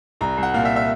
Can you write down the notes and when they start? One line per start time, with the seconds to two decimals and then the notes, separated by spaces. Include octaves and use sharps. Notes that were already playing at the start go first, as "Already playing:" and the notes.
0.21 C2 A#5
0.37 C2
0.43 F#5
0.54 A#2 F5
0.65 E5
0.76 E5